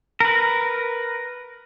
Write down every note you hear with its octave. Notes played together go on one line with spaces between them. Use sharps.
A#4 B4